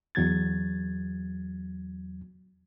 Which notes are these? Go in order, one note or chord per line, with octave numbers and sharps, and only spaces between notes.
E2 F#3 G#6 A6